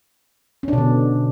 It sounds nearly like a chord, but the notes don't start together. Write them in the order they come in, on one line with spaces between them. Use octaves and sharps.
C#4 D4 B2 D3